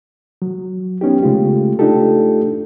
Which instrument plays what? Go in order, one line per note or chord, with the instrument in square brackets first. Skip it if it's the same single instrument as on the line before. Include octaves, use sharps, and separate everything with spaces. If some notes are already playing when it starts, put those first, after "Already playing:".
[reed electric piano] F#3
B3 C#4 D#4 G4
C#3 G#3 A3 F4 G4
A3 D4 D#4 F4 G4 A4